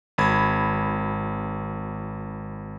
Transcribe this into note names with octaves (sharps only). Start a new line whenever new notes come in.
G#1 B5 G#6